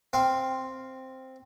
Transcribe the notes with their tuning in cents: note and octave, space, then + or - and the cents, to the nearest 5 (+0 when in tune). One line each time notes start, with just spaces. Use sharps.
C4 +0 F5 +0